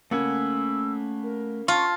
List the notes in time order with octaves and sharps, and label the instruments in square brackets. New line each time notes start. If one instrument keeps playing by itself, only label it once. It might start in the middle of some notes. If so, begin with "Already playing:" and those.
[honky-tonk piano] C#3 A#3 [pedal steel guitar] A3 F#5 G#5 [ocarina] E6
[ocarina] A#4
[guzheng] F4 [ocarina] A5 [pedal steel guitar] C#6